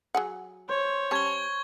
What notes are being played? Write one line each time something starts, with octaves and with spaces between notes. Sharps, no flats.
F#3 G#4 F#5
C5 C#5
G3 C#4 A5 C#6 G#6 G7